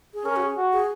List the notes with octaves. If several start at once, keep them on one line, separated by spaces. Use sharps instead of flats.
G#4
C#4 A#4
F#4
G#4
F#4
G#4